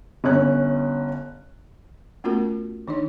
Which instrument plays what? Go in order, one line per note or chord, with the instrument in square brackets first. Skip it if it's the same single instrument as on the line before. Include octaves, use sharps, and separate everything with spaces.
[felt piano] G1 C#4 F#6
[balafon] A3 B3 C#4 F4 F#4 A#4
D#3 D4 D#4 C#5